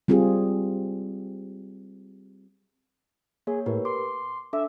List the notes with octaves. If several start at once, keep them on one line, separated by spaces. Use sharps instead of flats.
G3 C4 F4 G4 G#4
A#3 G#4 C#5
A2 G4 A#4 B4
C6 D6
D4 A4 E5 D6